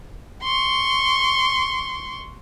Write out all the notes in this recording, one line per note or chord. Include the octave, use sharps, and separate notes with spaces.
C6 C#6